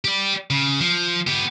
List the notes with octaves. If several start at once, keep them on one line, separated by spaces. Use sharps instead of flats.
G4 D5
C#3
F3
B3 G4